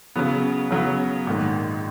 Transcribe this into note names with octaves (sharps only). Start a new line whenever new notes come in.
C#3 F#3 B3
C#3 F#3 B3
A#1 G#2 D#3